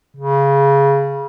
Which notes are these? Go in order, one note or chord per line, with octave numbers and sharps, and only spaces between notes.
C#3